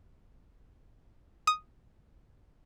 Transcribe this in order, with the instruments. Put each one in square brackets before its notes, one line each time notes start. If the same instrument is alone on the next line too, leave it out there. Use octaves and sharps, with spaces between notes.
[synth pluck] D#6